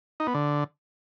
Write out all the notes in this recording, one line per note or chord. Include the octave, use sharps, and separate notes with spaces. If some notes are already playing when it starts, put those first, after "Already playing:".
D#4
B3
D3